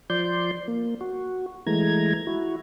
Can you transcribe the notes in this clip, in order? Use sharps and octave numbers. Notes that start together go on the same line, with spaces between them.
F3 D5 C6 G6
A#3
F#4
E3 G#3 A3 A#5 G#6
E4 F#4